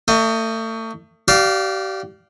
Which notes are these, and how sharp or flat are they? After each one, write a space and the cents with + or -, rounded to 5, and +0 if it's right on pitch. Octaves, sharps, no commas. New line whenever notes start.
A3 +35 D#5 -10
G4 -35 D5 +0 F5 +0